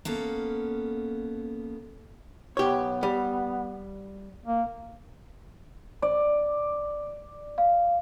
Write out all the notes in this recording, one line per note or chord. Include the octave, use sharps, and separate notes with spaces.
A#3 B3 C#4 A4
B1 B3 G4 C#5
G3
A#3
D5
F5